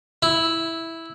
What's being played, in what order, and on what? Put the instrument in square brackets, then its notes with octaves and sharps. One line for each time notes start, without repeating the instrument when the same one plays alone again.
[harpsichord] E4